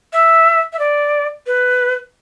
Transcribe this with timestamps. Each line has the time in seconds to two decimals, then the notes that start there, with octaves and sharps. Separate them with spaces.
0.13 E5
0.73 E5
0.79 D5
1.47 B4